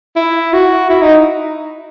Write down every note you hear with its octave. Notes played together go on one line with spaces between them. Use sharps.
E4
F#4
E4
D#4